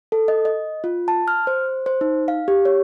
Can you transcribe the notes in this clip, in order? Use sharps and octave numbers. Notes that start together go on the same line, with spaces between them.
A4
D#5
D#5
F4
A5
F6
C5
C5
D#4
F5
G4
C#5